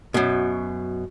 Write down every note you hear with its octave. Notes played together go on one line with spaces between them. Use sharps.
F#2 B2